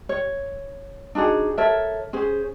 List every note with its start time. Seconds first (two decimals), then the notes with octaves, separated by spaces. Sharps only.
0.09 C#5
1.15 D4 D#4 F#4 G#4
1.57 A4 A#4 C#5 E5
2.13 C#4 G#4 C5